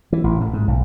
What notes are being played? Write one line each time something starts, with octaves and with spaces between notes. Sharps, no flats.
E3
A1
A2
G#2
B1